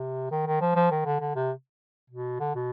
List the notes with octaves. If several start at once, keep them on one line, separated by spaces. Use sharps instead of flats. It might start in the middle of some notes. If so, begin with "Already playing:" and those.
Already playing: C3
D#3
D#3
F3
F3
D#3
D3
D3
C3
B2
D3
B2